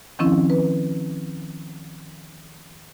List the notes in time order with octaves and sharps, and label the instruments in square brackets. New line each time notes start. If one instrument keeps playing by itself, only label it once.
[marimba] D#3 F3 C4 C#4 E4
B4